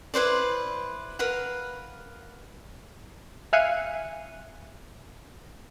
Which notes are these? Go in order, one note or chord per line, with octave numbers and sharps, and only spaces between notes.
E4 B4 C5 D5
A#4 B4 F5 F#5
E5 F5 G#5 F#6 C#7 D#7